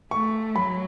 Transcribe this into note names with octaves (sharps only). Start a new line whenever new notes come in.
A3 C#6
F#3 B5